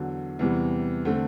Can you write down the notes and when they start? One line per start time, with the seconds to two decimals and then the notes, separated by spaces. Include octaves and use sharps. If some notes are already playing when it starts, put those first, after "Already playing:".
Already playing: E2 D3 F#3
0.39 E2 C3 E3 G3
1.05 D3 A3 C4